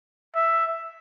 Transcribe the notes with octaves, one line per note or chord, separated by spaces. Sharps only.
E5